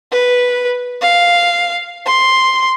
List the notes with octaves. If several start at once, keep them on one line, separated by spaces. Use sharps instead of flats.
B4
F5
C6